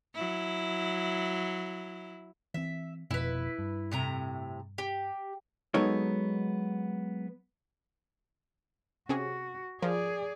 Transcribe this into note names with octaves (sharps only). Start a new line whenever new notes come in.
F#3 E4
E3 C4 E5
F1 F2 B2 E4 B4
G2
A2 C3 A#5
G4
F#3 G#3 B3 D#4 A4 C#5
C3 C#4 F#4 G#4
F3 G#4 A#4 D5